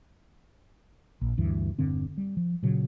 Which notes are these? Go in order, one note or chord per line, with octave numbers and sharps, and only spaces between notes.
A#1
D2 G2 E3
E1 G2 D3 C4
G3
F3
A#2 C#3 F#3